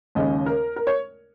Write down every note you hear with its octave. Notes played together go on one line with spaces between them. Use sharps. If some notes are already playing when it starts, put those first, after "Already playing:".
D#2 C#3 G#3 C#4 D#5
A#4
A#4
C#5